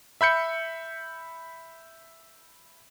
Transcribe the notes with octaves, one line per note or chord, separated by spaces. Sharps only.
E5 B5 G6 C#7